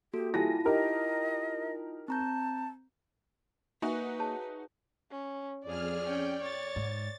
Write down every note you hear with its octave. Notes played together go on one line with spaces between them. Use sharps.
A#3 F#4 G4 A4
G3 E4 F4 G#5 A5 A#6
D#4 G4 A#4 D#5
C4 A5 A#5 G6
A#3 D#4 F#4 B4 E5 G#5 C#6
G#4 C#5 A5
C#4
F2 G#4 D5 F6
C#4 G5
C#5 A6
G#2